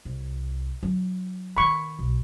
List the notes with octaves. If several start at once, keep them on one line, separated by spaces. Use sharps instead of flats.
C2
F#3 E4
D#3 B3 B5 C#6
B1 B2